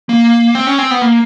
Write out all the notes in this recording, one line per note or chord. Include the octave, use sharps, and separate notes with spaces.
A#3
C4
C#4
C4
B3
A#3